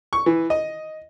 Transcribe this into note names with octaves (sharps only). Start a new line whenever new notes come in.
C#6
E3
D#5